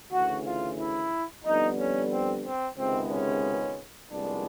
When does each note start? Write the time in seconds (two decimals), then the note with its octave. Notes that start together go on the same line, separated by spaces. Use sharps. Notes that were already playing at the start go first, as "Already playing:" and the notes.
0.12 D2 C#3 E3 F#4
0.46 F4
0.79 E4
1.45 F2 D3 G3 B3 D#4
1.79 C#4
2.11 C4
2.45 C4
2.78 C#2 C3 D#3 G#3 B3 C4
3.11 C#4
4.11 C2 A#2 F3 G#3 B3 D4